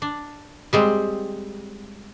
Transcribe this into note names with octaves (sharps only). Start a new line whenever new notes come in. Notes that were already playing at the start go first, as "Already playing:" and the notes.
D4
G3 G#3 C4